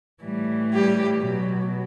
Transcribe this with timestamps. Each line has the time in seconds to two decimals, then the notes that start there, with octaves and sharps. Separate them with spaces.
0.21 A2 E3 G3
0.72 G3 G4
1.24 B2 F#3